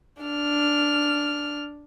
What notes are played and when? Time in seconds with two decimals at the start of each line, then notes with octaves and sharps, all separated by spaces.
0.22 D4 F6